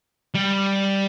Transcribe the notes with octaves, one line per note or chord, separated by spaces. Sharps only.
G3